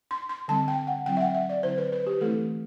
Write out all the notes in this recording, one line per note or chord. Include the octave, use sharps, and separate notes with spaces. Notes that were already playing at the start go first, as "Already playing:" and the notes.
C6
C6
D3 G3 C4 A5
G5
F#5
D3 F#3 C4 E4 G5
E5
F#5
E5
D5
D3 F#3 C4 E4 C5
B4
B4
G4
E3 A3 C4 E4 A4